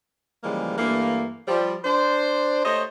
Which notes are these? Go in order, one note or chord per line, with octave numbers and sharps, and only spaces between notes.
C#3 E3 F3 G3 G#3 A#3
G2 E3 A3 A#3
F3 G3
D4 C5
A3 G4 C5 C#5 D#5